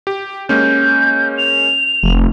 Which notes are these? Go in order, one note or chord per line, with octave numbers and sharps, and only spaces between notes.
G4
G#3 A#3 C#4 G6
F7
F1